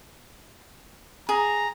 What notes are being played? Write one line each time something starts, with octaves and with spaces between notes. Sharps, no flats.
G#4 A#5